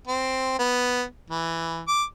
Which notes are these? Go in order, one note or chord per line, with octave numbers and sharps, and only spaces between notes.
C4
B3
E3
D6